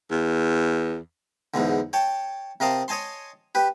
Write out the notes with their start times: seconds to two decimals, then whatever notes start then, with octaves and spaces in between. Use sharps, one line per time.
0.11 E2
1.54 E2 G#2 B2 D3
1.93 C#5 G5 A5
2.60 C3 A#4 D#5 F5 A5
2.88 C#5 D#5 G#5 A5 C6
3.55 G4 B4